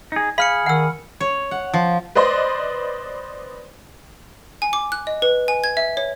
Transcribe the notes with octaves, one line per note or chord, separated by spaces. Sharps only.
D#4 G#4
G#4 F5 B5 F6 C#7
D#3 F#5 E6
C#5
F#5
F3
B4 C5 D5 D#5 C6
G#5
D6
F#6
D#5
B4
G#5
G#6
E5
C#5